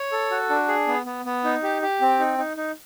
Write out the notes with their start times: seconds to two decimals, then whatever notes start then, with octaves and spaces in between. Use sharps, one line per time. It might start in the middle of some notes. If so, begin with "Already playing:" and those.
Already playing: C#5
0.12 A4
0.31 F#4
0.50 D4
0.68 G#4
0.88 B3
1.06 B3
1.25 B3
1.44 D#4
1.63 G4
1.82 G4
2.01 C4
2.19 D#4
2.38 D#4
2.57 D#4